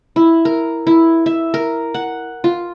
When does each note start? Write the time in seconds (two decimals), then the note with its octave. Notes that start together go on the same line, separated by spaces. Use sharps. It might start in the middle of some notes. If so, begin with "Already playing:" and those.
0.16 E4
0.45 A#4
0.87 E4
1.26 E5
1.54 A#4
1.94 F#5
2.44 F4